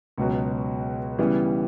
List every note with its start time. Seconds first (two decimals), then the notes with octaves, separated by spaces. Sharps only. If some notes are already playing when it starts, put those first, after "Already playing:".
0.18 C#2 B2 F#3
1.19 C#3 E3 G3 B3